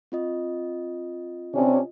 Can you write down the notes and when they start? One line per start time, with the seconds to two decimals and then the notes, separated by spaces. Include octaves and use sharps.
0.12 C4 F4 D#5
1.54 C3 C#4 D4